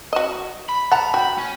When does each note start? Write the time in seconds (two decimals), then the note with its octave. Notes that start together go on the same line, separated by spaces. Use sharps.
0.13 F#4 D#5
0.69 B5
0.92 F#5 A5 A#5
1.14 F#4 G5
1.38 C#4